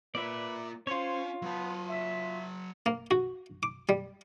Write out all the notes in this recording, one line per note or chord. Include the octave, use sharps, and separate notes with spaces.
A#3 F4 B4 D5 E5
C#4 F4 C5 C#5
F#3 B3 A5
E5
A#3
F#4
D6
G3